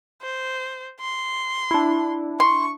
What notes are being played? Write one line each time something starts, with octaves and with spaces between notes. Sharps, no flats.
C5
C6
D4 E4
C6 C#6